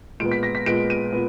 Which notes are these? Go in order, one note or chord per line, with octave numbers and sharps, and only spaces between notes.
A#2 G#3 B3 D7
B6
A#6
B6
A#2 G#3 B3 D7
D#7
A#2 B3